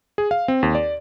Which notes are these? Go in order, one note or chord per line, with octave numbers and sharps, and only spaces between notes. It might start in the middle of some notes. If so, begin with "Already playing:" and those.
G#4
F5
C4
D#2
D5